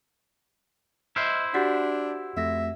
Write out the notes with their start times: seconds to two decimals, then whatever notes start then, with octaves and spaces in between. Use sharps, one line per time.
1.16 E4 C5 D#5 E5 F6
1.54 D4 F#4 G4 F#5 G6 A6 B6
2.37 F2 A3 E5 A#6